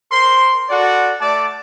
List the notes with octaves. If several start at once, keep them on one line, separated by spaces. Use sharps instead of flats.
A#4 C5 C6
F#4 A4 D5 F#5
A3 D5 A5 D6